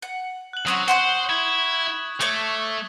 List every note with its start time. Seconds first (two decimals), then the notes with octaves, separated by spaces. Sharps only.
0.02 F#5
0.53 F#6 F#7
0.67 F#3 C4 C#4 F#4 C#6 D#6
0.88 C5 F#5 C6 F#6
1.30 E4 G#6
2.21 A3 C#5 C#6 D6